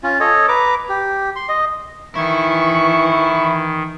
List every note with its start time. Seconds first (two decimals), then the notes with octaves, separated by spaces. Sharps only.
0.03 C#4 F4
0.20 A4 C#5 D#5
0.48 B4 A#5 D6
0.89 G4
1.36 C6
1.49 D#5
2.15 D#3 E3 E4 C#6